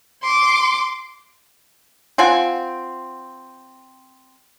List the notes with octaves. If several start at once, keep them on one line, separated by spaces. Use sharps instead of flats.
C6 D6
C4 F4 F#5 G#5